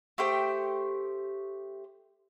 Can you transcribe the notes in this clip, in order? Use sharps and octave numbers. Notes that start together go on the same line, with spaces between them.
A3 G4 C5 G5